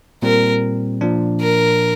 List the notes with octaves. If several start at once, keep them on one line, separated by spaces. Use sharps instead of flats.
A#2 G3 C4 A#4
A#2 F3 D4
A#4